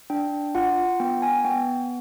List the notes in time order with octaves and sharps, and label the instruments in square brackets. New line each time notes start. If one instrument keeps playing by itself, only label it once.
[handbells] D4 G5
F4 F#5
B3 G5
G#5
B3 G5